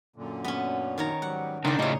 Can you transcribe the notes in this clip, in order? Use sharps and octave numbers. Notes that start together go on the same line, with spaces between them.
F#2 A#2 D3
B3 C#4
D#3 C#5 A#5
G#2 F#3 G3 F#5
C#3 D4 D#4 A#4 D5 G5 A#5 C6
A2 C#3 E4 F4 G4 G#4 C#5 D#5